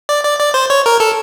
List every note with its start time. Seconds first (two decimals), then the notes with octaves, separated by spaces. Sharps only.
0.09 D5
0.24 D5
0.39 D5
0.54 C5
0.70 C#5
0.86 A#4
1.00 A4